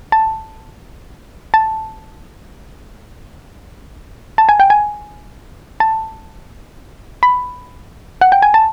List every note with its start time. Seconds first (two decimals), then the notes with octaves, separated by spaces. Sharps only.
0.12 A5
1.54 A5
4.38 A5
4.49 G#5
4.60 G5
4.70 G#5
5.80 A5
7.23 B5
8.21 F#5
8.32 G5
8.42 G#5
8.54 A5